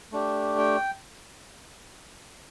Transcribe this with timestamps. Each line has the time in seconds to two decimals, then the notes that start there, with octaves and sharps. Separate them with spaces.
0.12 A3 D4 G4
0.58 G5